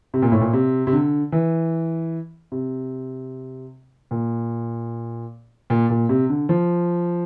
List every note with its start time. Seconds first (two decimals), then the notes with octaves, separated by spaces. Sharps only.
0.14 C3
0.22 A#2
0.32 A2
0.41 A#2
0.53 C3
0.87 C3
0.93 D3
1.32 E3
2.52 C3
4.11 A#2
5.70 A#2
5.90 A#2
6.09 C3
6.30 D3
6.49 F3